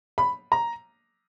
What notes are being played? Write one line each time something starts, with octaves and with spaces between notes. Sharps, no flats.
B5
A#5